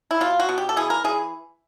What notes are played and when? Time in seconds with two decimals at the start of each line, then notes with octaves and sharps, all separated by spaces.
0.11 E4
0.21 B2 F4
0.40 F#4
0.49 B2
0.58 G4
0.69 A4
0.77 E3 G#4
0.90 A#4
1.04 E3 G#4